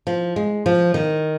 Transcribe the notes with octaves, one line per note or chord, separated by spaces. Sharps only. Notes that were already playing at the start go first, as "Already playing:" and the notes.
F3
G#3
F3
D#3